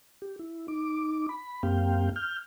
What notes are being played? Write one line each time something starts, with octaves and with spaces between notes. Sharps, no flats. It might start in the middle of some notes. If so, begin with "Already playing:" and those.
G4
E4
D#4 D6
B5
F#2 A#3 C4 G4 F5 G5
F6 G6